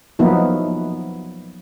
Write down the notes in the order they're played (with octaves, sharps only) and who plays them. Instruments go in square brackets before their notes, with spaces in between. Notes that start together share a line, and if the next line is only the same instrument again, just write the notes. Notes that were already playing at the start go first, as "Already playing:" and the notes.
[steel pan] F3 F#3 A#3 B3 D#4 E4